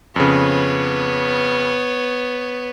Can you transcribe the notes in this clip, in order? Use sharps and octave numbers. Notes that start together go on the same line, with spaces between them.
F2 C#3 B3 C#5